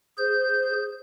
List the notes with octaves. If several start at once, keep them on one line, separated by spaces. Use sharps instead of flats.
G#4 C5 G6